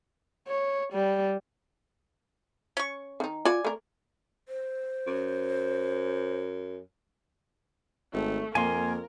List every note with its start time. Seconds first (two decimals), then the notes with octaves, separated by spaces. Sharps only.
0.48 C#5
0.93 G3
2.77 C#4 C#6
3.20 D#3 D#4
3.45 F4 F#4 D5 G#5
3.65 A3 A#4
4.48 C5
5.07 F#2
8.13 G#1 A3
8.55 F2 A#3 A#4 G#5 C6